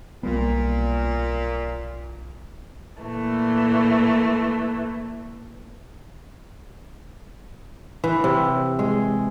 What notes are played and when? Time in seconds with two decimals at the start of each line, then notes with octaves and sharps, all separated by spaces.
0.23 B1 A#2 G3 B3
3.02 A#2 E3 A3
8.04 E3
8.24 C3
8.79 G#3